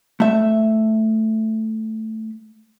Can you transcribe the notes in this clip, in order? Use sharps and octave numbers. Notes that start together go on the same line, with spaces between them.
A3 E5